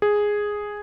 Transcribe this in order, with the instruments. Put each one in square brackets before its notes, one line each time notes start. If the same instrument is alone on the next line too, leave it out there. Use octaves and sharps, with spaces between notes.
[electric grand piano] G#4